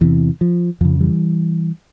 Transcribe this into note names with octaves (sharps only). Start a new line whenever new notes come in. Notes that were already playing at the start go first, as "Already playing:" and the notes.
E2 C3 E3
F3
F2 C#3 F3
E3 G3